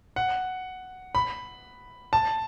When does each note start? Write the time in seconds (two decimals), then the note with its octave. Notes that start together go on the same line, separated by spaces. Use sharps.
0.16 F#5
1.15 B5
2.13 A5